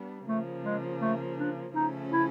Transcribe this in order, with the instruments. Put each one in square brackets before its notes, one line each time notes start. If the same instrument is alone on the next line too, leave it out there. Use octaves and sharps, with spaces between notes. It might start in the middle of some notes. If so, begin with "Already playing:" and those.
Already playing: [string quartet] G3 B3 D4
[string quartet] C#3 F3 A#3 [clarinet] A3
[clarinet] G#3
A3
D4
[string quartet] C#3 F3 A3 C#4 [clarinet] D#4
[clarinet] E4